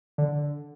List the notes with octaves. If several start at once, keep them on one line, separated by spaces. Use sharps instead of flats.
D3